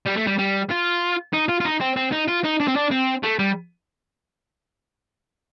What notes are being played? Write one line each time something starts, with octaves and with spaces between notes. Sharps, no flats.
G3
A3
G3
G3
F4
D#4
F4
F4
D#4
C4
C4
D#4
F4
D#4
D4
C4
D4
C4
A3
G3